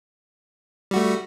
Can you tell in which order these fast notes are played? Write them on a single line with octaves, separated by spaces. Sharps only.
G3 F#4 A3